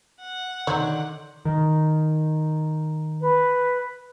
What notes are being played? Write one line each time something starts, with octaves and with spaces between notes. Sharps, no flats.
F#5
D3 D#3 F#3 C#5 C6 G6
D#3
B4